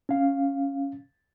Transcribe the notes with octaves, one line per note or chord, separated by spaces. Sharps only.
C#4 F5